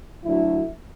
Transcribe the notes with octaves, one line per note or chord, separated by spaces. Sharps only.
D2 D3 F#3 E4